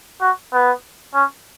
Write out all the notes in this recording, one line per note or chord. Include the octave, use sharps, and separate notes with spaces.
F#4
B3
C#4